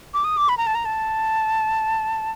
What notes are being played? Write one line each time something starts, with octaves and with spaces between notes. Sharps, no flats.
D6
D#6
D6
B5
A#5
A5
A#5
A5